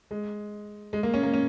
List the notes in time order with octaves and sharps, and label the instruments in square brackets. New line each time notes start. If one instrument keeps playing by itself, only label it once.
[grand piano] G#3
G#3
A#3
C#4
A#3
C#4